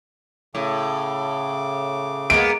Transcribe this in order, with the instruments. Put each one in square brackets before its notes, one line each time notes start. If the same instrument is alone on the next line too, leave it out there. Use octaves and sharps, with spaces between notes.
[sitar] A2 [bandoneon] C#3 D6
[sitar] G#3 A#3 B3 [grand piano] D7